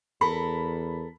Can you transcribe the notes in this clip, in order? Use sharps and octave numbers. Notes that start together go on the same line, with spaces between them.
E2 A4 A#4 B5